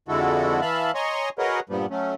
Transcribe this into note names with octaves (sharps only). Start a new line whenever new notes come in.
F2 D3 G#3 E4 F#4 A4
E3 E5 F5 A5 B5
C#5 D#5 G#5 A#5 C6 C#6
F#4 G#4 A#4 B4 C#5 D#5
G2 A#2 F3 G3 B3
F#3 A3 C#4